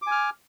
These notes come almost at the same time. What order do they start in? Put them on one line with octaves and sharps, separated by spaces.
D6 G#5 F6